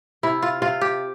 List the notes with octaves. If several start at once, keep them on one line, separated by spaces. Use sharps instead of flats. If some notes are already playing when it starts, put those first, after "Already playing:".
C3 E4
F4
C3 F4
G4